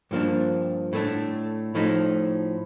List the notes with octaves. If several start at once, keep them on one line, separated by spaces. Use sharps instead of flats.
G2 F3 A#3 D4
A2 A3 D4
A2 F3 A3 D#4